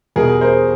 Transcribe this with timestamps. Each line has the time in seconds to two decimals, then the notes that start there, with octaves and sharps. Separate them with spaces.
0.16 E2 B2 G3 G#4 A#4
0.41 A#4 C5